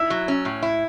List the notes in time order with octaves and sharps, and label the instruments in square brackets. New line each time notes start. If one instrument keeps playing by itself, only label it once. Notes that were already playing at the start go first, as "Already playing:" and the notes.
Already playing: [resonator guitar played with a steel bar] E4 [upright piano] E6
[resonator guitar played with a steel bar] F#3
C#4
A2
E4